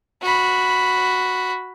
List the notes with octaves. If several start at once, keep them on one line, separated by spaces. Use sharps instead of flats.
F#4 B5